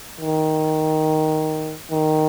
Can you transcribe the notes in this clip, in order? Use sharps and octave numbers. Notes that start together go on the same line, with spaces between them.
D#3
D#3